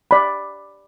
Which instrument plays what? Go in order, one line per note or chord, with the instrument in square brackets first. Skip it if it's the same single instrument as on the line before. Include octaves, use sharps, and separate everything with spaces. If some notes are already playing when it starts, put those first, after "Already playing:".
[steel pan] D5 B5